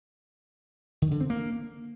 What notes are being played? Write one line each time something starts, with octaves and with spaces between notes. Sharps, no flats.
D#3
D3
C4
A#3